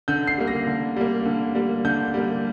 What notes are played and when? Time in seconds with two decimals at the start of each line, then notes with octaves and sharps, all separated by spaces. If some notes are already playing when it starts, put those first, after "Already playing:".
0.08 D3 G6
0.27 C7
0.38 G3 A#3
0.47 A#6
0.67 D3
0.96 G3 A#3
1.26 D3
1.55 G3 A#3
1.85 D3 G6
2.14 G3 A#3